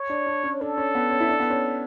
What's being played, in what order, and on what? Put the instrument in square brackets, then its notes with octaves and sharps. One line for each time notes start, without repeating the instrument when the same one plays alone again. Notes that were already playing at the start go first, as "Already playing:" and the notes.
Already playing: [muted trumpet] C#5
[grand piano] D4
D4
C#4
[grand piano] D4 [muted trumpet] A4
[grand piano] C#4
B3
C#4
E4
D4
B3
C#4